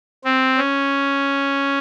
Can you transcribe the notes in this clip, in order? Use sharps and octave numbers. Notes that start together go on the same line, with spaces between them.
C4
C#4